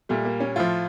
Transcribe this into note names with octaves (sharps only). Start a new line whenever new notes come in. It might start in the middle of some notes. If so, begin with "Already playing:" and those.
A#2 G3 A3
A#3
C#4
A2 F3 F4